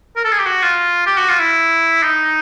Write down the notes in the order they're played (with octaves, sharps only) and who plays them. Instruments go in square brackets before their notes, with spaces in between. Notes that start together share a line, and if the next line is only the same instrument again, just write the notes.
[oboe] A#4
A4
G#4
G4
F#4
F4
G4
F#4
F4
E4
D#4